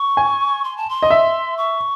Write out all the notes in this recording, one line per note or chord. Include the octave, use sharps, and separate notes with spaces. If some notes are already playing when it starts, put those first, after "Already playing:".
Already playing: C#6
G#5
C6
A5
C6
D#5
E5
C#6